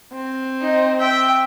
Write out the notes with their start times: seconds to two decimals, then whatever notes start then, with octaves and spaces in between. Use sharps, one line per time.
0.13 C4
0.61 D#4
1.00 E5 G5